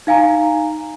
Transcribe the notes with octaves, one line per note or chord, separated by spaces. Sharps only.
D#4 F5 G#5 A#5